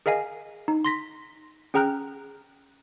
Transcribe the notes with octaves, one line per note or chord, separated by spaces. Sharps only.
G#4 A#4 D#5 F5 G#5
D#4
C6 A#6 B6
C#4 G#4 G5 A#5 F6 F#6